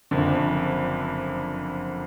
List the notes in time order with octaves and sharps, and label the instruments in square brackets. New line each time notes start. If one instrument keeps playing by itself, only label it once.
[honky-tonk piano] F#1 F2 D3